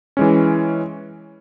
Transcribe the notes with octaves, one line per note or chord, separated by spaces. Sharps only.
E3 G#3 C#4